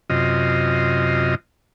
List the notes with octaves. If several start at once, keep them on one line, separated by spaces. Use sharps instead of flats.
F#2 C3 F4 D#5